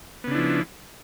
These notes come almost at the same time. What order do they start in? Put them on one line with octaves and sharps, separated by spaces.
B3 C#3 D4 E4 F3